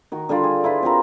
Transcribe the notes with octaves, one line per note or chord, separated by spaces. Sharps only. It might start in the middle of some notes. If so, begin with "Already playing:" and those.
D#3 F#4
D3 G3 F4 D5
G#4
E4 F4 B4
C4 F4 F#4 A#4